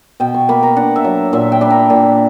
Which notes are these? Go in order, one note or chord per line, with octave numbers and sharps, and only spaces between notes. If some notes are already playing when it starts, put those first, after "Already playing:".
B2 G5
C#6
A#3 B5
A#5
D4 F#5
E5
F#3
A#2 E5
G5
D4 B5
A#5
A#2